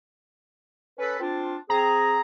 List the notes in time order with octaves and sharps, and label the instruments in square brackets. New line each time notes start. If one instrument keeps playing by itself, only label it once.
[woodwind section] C#4 A4 B4
C4 D4 F4
[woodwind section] C4 G#4 [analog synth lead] A#5